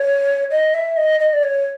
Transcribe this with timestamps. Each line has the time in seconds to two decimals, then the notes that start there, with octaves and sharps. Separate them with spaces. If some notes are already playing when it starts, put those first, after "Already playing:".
Already playing: C#5
0.51 D#5
0.74 E5
0.97 D#5
1.20 D#5
1.33 D5
1.43 C#5